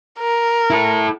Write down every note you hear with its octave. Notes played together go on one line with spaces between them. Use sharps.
A#4
E4 A4